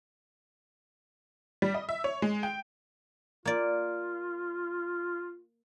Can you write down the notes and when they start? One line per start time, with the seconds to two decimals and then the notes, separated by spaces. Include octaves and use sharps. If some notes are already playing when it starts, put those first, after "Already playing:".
1.62 G3
1.74 D#5
1.89 E5
2.04 C#5
2.22 G#3
2.43 G5
3.45 A#3 F4 D5